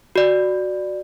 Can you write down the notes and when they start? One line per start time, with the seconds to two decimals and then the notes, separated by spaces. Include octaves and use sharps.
0.16 F#4 D5